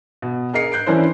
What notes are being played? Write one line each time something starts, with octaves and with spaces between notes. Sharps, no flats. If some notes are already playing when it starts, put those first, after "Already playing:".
B2
G#4 A#4 D#5 C7 C#7
F#6 G6 C7 D7
E3 C#4 D4 E4 A#4 C5